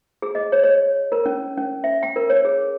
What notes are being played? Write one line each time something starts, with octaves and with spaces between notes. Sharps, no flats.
G#4
D#5
C#5
C#5
A#4
C#4
C#4
E5
G5
A#4
C#5
G#4